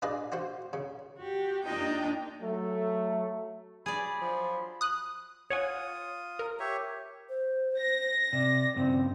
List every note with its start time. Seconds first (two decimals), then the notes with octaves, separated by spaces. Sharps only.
0.02 D4 F4 G#4 B4 D5 D#5
0.32 F4 F#4 C5
0.73 C#3
1.18 F#4 G4
1.63 A#3 D4 D#4 F4 D#5 G5
2.41 F#3 A3
3.86 F#3 D4 G#4 D5 B5
4.21 F3
4.81 D#6 F#6
5.50 F4 C#5 F#5 G#5 D#6
6.39 A#4
6.59 G4 C#5 E5
7.29 C5
7.79 A#6
8.33 C3 D5
8.76 G2 C#3 C4